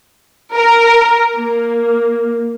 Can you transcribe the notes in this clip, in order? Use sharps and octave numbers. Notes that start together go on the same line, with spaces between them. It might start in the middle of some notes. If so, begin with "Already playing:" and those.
A#4
A#3